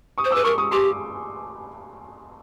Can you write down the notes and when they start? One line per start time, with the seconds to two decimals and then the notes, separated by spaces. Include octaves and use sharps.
0.18 C#6 D#6
0.25 C5
0.31 B4 D6 E6
0.44 A#4 C#6 D#6
0.58 C#6 D#6
0.71 G4 C6 D6